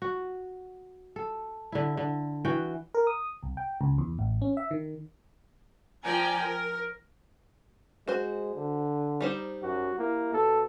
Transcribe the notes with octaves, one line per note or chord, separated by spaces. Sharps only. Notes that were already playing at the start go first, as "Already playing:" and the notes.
F#4
A4
D3 E4
D3
E3 F#4 G5
A#4
D#6
C2
G5
C#2
E2
A1
C#4
E5
D#3
F3 D5 G5 G#5 A#5
A#4
G#3 F#4 C5
D3
G3 D#4 C5
F#2 F#4
A#3 E4
B2 A4